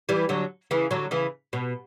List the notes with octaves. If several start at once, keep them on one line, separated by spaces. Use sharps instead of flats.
E3 G3
D3 F#3
C#3 E3
D3 F#3
C#3 E3
B2